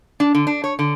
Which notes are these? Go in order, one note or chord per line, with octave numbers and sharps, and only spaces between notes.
D4
D3
D4
C#5
D3